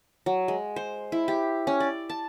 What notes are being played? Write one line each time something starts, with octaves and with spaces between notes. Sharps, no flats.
F#3
G#3
C5
E4
G4
C#4
D5
A5